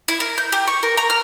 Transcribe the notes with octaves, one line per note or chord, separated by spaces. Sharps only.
E4
A#4
G6
G4
C#6
A#4
A#5
F6